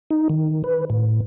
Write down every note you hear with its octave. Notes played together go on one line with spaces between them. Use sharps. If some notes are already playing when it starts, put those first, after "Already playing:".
D#4
D#3
B4
A2